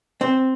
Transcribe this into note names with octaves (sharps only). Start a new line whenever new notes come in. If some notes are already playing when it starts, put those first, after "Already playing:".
C4